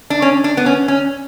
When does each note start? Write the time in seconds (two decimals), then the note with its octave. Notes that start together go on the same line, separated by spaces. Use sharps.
0.10 D4
0.22 C#4
0.44 D4
0.57 B3
0.66 C#4
0.88 C#4